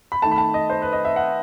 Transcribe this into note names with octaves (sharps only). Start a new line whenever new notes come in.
B5
D#3 A3 A5
B5
A5
D#5
C5
B4
D#5
E5
F#5